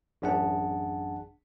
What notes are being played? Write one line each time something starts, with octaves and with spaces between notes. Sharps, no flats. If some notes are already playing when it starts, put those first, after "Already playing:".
A1 F#2 D4 G#4 F#5 A5